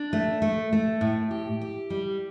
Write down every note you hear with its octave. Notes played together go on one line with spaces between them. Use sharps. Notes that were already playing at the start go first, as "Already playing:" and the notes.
Already playing: D4
A3
A3
A3
A2
G4
G4
G3